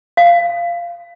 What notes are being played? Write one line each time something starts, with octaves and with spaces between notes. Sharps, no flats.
F5